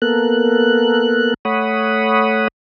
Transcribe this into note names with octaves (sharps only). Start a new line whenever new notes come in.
A#3 B3 A4 A#4 F#6
A3 C#5 F#5 B5 D#6